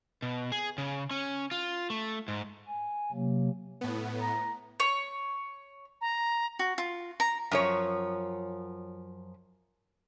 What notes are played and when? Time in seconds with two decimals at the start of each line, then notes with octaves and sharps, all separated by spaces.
0.22 B2
0.52 G#4
0.78 C#3
1.11 C#4
1.51 F4
1.90 A3
2.28 G#2
2.67 G#5
3.12 C3 F#3 A#3
3.81 A2 B3
4.19 A#5
4.80 C#5
6.01 A#5
6.59 F#4
6.78 F4
7.20 A#5
7.51 F#2 F3 C#5